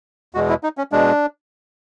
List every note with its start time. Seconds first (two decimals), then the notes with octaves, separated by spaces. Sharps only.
0.35 E2 B2 G#3 F#4
0.49 E4
0.64 D#4
0.78 C#4
0.92 B2 G#3 D4